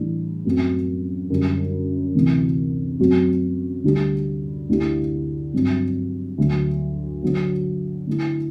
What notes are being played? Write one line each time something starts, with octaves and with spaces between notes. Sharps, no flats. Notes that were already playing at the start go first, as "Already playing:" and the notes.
Already playing: A2 E3 G3 B3 D4
F#2 F#3 A3 C4 F#4
F#2 D3 G3
D2 C3 E3 A3
F#2 F#3 A3 C4 F#4
D2 D3 G3 D4 G4
D2 D3 A3 E4 G4
G2 F#3 C4
D2 D3 F#3
D3 F#3 B3
D3 A3 E4